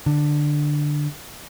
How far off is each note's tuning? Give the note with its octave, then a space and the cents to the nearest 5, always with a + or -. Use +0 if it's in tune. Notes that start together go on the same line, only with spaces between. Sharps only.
D3 +10